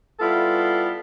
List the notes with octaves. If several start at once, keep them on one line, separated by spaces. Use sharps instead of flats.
G3 B3 E4 F4 A4